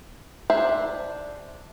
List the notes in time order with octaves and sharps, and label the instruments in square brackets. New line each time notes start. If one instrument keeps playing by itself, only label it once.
[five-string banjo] D4 G#4 C5 E5 A5